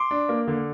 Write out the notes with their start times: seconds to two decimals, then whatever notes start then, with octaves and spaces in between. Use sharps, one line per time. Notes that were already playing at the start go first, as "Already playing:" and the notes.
Already playing: C6 D6
0.11 D4
0.29 A#3
0.47 D3